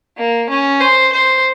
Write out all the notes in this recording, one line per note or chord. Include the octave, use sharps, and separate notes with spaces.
A#3
C#4
C5
C5